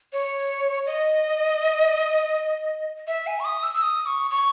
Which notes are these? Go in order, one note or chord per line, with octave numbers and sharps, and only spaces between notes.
C#5
D#5
E5
G#5
C#6
D#6
E6
E6
D#6
C#6
C#6